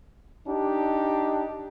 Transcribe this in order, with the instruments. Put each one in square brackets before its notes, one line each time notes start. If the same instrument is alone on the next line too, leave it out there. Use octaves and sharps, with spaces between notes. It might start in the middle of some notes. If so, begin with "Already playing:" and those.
[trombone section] D4 D#4 G4